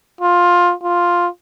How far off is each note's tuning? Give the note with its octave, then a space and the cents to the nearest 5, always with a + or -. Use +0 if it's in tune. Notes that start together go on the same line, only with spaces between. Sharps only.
F4 +15
F4 +5